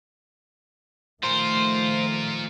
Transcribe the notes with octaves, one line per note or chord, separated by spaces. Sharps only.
D#3 F3 A3 F4 A#4 C5